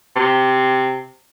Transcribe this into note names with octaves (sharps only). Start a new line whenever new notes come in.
C3